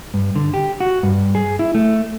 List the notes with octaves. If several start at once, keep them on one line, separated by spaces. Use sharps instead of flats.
G2
D3
G4
F#4
G2
G#4
E4
A3